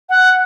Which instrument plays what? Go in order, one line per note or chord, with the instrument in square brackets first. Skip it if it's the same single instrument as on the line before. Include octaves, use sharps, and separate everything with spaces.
[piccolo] F#5